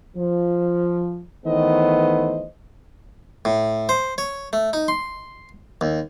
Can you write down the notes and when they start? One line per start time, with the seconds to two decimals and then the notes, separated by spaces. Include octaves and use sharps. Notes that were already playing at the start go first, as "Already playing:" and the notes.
0.17 F3
1.46 D#3 E3 A3 B3 C5 D#5
3.45 A2
3.89 C5
4.18 C#5
4.53 A3
4.73 D#4
4.88 C6
5.81 D#2